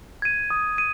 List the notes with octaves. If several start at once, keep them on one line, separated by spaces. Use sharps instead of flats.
G#6 D#7
D#6
D#7